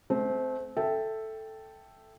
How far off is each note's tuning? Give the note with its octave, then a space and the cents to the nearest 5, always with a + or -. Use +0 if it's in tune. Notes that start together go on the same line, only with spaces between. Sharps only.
A3 -35 C4 -10
A4 +0 E5 +0 G5 +0